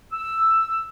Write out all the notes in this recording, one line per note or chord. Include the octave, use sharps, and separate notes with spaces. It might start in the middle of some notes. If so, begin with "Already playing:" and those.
E6